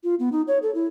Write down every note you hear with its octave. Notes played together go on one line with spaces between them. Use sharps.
F4
B3
D#4
C#5
A4
E4